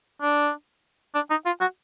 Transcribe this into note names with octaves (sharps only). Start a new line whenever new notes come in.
D4
D4
D#4
F4
F#4